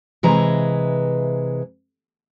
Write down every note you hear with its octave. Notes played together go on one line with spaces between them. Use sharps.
C3 E3 G#3 B4 A#5